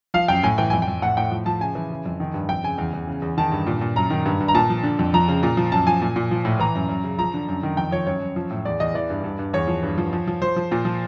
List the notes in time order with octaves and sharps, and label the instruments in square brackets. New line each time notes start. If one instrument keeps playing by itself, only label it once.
[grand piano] F3 F5
F#2 G5
A2 G#5
E3 G5
F2 G#5
G5
F2
A2 F#5
A2 G5
F3
F3 A5
C#3 G#5
E3
C#3
F2
D#3
G2
F2 G5
C#3 G#5
E2
E2
C#3
E2
D#3 A5
G2
A#2
A#2
F#2 A#5
D#3
G2
G2
A#5
A#2 A5
F3
D3
F2
F3 A#5
C#3
A#2
F3
F#2 A5
F3 G#5
A#2
A#2
F3
A2
E3 A#5
F#2
F#2
C#3
F3 A#5
D3
F#2
D#3
F2 G5
F3 C#5
F#2 C#5
F#2
F3
A2
E2 D5
E2 D#5
E3 D5
G2
G2
G2
E2 C#5
F3
G2
F3
F3
F3
F3 C5
F3
A#2
F3